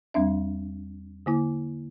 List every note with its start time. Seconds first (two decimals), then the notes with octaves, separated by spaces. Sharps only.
0.14 E2 G3 C4 D4 E5
1.26 D3 A#3 E4